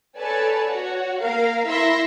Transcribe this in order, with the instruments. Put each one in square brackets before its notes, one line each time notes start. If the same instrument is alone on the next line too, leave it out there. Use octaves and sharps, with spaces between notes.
[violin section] A4 B4 C#5 D5 G#5 A5
F#4 C#5
A#3 A#4 F5
E4 E5 C6 A#6